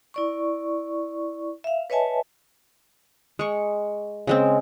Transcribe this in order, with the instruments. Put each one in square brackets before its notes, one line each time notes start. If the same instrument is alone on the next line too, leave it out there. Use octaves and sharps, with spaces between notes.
[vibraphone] E4 D5 C#6
E5 F5
B4 C#5 D#5 E5 G#5 A5
[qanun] G#3 C#6
C#3 G#3 C4